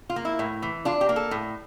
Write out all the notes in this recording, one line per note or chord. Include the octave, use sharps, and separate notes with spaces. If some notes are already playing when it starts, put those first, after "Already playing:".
F4
A#3
E4
A2
E3
D4 F4
G4
A#3
A4
A2